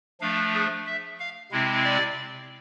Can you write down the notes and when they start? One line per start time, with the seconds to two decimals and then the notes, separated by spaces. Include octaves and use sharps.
0.21 F3 A3 D4 F5
0.54 G#4
0.86 E5
1.20 F5
1.51 C3 G#3 C4 E4
1.84 D5